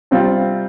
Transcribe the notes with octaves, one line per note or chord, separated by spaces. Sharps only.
C3 G3 C4 F4